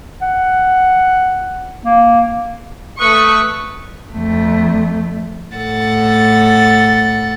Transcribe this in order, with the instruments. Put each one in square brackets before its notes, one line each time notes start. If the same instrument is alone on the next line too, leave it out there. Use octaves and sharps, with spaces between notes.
[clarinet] F#5
A#3
[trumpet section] A3 D#6 [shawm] B4 [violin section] C#6
[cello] F2 A3
[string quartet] A2 A4 F#5 A6